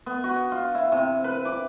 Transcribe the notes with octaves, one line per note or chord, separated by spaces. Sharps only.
B3
F#4
F4
E4
C3
B4
D6